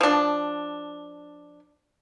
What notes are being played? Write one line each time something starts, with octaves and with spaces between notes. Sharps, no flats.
F3 D4